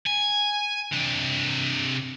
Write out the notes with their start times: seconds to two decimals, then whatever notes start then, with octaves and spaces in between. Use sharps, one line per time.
0.06 G#5
0.92 C3 D4